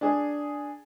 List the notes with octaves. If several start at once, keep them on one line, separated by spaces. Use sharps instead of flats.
D4 G#4